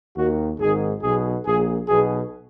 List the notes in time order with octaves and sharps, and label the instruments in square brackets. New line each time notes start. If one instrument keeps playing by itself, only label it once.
[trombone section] D#2 D#3 F#4
G#1 G#2 D#3 G#4
B1 B2 G#4
A#1 A#2 G#4
B1 B2 G#4